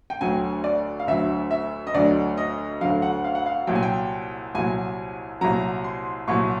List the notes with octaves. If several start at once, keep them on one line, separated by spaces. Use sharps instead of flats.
G5
D2 D3 F#3 G#5
D5
F5
D2 D3 F#3 E5
E5
D#5
D2 D3 F#3 D5
D#5
D2 D3 F#3 F5
F#5
F5
F#5
F5
C2 A#2 F#3 G5
G#5
G5
C2 A#2 F#3 G#5
C2 A#2 F#3 A#5
C6
C2 A#2 F#3 C#6